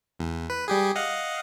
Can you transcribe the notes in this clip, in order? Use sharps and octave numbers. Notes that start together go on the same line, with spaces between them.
E2
B4
G3 G4 G#4
D#5 F5 F#5